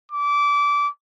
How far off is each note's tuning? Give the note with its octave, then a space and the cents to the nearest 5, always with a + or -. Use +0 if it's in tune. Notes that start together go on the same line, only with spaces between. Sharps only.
D6 -20